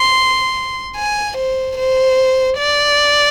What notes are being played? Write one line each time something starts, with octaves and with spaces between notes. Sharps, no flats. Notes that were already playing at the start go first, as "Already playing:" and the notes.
Already playing: C6
G#5
C5
C5
D5